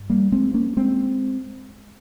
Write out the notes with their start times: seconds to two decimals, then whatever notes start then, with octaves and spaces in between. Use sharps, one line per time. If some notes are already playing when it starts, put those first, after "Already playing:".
Already playing: G2
0.10 G3 A#3
0.32 G#3 C4
0.54 A#3 C#4
0.77 G#3 C4